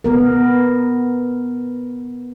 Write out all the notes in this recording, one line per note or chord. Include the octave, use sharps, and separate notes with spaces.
B3 A#4